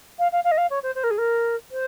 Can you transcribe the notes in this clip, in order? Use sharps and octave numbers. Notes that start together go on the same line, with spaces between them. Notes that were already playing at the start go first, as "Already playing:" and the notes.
F5
F5
F5
D#5
F5
C#5
C5
C5
A#4
G#4
A#4
C5